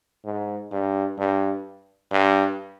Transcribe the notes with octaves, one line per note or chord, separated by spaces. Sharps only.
G#2
G2
G2
G2